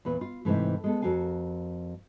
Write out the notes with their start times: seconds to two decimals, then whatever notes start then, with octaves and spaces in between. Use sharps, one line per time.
0.05 E2 A#2 B4
0.21 F4
0.45 G#2 C3 E3 A3
0.84 G#3 B3 A4
1.02 F2 F#4 A#4 F5 G#5